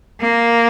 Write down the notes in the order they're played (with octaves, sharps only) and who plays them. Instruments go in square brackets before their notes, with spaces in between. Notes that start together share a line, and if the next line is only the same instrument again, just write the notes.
[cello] A#3